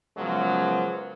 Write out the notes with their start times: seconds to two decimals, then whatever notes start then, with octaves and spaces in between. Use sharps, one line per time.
0.17 F#2 C#3 F3 F#3 G#3 B3